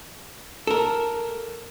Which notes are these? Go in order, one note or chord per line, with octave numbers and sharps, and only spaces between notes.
A4 A#4